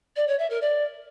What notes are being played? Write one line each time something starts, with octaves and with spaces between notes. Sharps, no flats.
D5
C#5
E5
A#4
D5